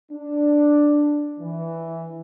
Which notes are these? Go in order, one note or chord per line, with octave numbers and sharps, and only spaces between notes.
D4
E3